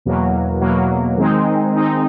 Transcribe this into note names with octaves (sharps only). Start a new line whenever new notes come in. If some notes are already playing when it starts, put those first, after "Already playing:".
E2 B2 F#3 A#3
E2 B2 F#3 A#3
D#3 G#3 C4 D#4
D#3 G#3 C4 D#4